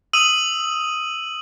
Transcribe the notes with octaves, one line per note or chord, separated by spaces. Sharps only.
D#6 E6 D#7 F#7